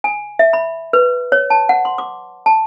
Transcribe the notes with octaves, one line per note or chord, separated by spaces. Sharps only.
G#5
E5
B5
B4
C#5
A5
F#5
C6
D6
A5